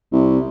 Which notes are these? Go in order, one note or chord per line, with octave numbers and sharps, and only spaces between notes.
C2